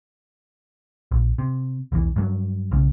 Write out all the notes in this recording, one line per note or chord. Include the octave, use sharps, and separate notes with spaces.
A#1
C3
B1 E2 E3
G2 F#3
B1 C#3